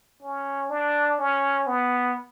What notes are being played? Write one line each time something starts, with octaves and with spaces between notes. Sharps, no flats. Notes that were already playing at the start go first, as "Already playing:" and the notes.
C#4
D4
C#4
B3